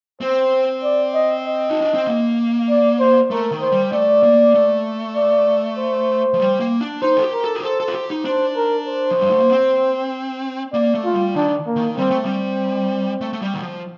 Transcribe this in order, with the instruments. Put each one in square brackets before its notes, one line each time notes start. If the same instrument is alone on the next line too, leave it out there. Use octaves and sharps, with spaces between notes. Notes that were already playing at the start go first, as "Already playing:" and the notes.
[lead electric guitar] C4 [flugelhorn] C5
[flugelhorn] D5
D#5
D#5
[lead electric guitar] D#4
D4
C4
A#3
[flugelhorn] D5
C5
[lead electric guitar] A3 [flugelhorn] A#4
[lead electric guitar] D#3
[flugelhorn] C5
[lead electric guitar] G3
[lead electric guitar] A3 [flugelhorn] D5
[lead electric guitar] A#3
A3
[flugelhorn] D5
C5
[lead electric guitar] F3
G3
A#3
D4
[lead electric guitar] D#4 [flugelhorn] C5
[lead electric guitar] A4
G4
[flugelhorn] A#4
[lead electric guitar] A4
G4
[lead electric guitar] A4 [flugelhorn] C5
[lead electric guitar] A4
F4
G4
D#4
[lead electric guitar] D4 [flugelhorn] C5
[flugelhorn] A#4
C5
[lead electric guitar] F3
G3
A3
A#3
C4
[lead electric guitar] A#3 [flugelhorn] D5
[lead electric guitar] A3
[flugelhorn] F4
[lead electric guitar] G3
[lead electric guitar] D#3 [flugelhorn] D4
[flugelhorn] A#3
[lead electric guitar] D#3
[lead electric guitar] G3 [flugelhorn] C4
[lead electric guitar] A3
[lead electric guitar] G3 [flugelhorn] C4
[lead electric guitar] A3
A3
G3
D#3
F3